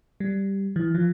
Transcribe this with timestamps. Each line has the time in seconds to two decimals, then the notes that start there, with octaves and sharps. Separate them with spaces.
0.20 G3
0.76 E3
0.94 F3